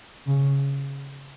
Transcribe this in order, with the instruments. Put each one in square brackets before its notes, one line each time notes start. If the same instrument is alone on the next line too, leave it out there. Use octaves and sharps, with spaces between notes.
[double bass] C#3